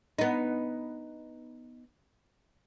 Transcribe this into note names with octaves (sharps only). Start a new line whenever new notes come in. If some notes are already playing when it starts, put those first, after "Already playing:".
B3 D#4